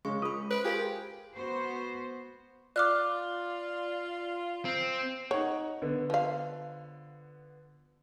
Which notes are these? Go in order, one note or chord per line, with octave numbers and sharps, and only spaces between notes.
C#3 G#3 C#4 C#6
F4 B5 D#6
B4 C5 D7
F4 G4 G#4 A#4
B3 F#4 C5
F4 D5 D6 F6 F#6
C4
D#4 C#5 F#5
D3 B3
F3 F5